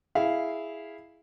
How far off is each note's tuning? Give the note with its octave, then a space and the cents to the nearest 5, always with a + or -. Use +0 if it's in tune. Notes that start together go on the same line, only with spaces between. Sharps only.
E4 +0 G#4 +0 F5 -5